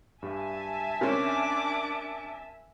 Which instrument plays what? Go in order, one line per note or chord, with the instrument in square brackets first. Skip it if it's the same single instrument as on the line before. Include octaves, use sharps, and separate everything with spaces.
[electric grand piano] G2 G3 [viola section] E5 G#5 A5
[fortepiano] C3 C#4 [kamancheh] D4 D6 [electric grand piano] A#4 C6